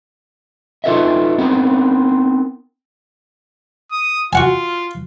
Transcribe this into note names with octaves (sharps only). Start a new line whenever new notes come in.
D#4 F4 A4 B4 D#5 E5
B3 C4 D#4 A#4
D#6
F4 F#4 F#5 G#5